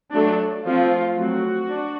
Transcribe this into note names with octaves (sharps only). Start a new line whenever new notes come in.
F#3 A3 D4
F3 A3 C4 F4
F#3 A3 C4 F#4
D4